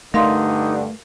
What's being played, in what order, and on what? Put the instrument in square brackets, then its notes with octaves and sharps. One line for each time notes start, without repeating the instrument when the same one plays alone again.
[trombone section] G2 D3 [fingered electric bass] A3 [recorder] D#4 [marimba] A#4 F5 C6